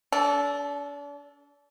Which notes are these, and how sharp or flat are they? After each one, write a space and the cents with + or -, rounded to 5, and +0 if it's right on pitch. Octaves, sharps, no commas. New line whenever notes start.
D4 -40 A4 +0